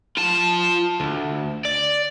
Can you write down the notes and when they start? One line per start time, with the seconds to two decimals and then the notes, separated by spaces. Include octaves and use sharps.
0.17 F4 A5
1.00 D2
1.65 D5